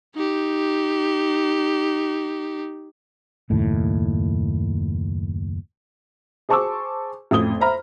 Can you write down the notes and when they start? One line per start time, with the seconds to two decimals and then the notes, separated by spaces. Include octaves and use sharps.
0.15 D#4 G4
3.50 F#1 D#2 A2
6.49 G#4 C5 A5 C#6 D6 E6
7.31 A1 F2 D#6 G7
7.60 C5 E5 A#5 B5 F6